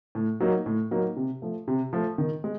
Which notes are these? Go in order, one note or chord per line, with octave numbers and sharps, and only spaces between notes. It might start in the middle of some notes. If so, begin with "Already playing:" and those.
A2
F#3 A#3 D#4
A2
F#3 A#3 D#4
C3
F3 A3
C3
F3 A3
D#3
G#3